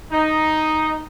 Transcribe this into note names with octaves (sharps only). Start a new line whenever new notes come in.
D#4